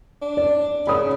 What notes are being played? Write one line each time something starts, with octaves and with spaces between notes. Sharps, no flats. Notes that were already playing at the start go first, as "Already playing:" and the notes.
D4
D5
C#3 B5 D#6